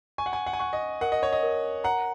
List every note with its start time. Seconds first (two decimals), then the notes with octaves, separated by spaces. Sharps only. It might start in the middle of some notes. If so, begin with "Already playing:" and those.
0.18 G#5 C#6
0.26 F#5
0.33 G#5
0.46 F#5
0.53 G#5
0.60 F#5 C#6
0.73 D#5
1.01 A#4 F#5
1.12 D#5
1.23 C#5
1.33 D#5
1.43 A#4
1.84 F#5 A#5